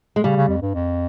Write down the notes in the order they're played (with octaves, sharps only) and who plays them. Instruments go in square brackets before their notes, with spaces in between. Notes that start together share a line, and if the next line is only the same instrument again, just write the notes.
[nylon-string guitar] G#3
[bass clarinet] C#3 [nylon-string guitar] G3
[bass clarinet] C#3
F2
G2
F2